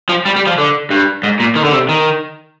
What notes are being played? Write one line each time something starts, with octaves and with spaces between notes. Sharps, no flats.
F3
G3
G3
F3
D3
G2
G#2
A#2
D#3
D3
C3
D#3